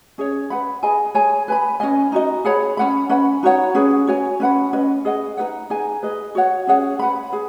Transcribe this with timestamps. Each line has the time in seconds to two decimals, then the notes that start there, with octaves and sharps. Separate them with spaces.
0.18 C#4 G#4 C#5
0.50 B4 F#5 B5
0.83 G#4 D#5 G#5 B5
1.15 G#4 C#5 G#5
1.48 B4 G#5 B5
1.80 C#4 G#4 D#5 G#5
2.12 D#4 F#4 D#5
2.45 G#4 C#5 F#5 B5
2.77 C#4 B4 F#5 B5
3.09 C#4 B4 F#5 B5
3.43 D#4 F#4 C#5 F#5
3.75 C#4 G#4 B4
4.07 F#4 C#5 G#5
4.40 C#4 B4 F#5 B5
4.73 C#4 B4 D#5
5.05 G#4 D#5 F#5
5.37 D#4 G#4 B4 F#5
5.70 D#4 G#4 D#5 G#5
6.03 G#4 B4 D#5
6.35 F#4 C#5 F#5
6.67 C#4 G#4 C#5 F#5
6.99 B4 F#5 B5
7.33 G#4